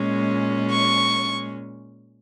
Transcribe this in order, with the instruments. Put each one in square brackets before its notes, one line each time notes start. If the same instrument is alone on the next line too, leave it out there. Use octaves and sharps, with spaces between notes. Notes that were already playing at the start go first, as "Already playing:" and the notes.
Already playing: [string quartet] A#2 G#3 C#4
C#6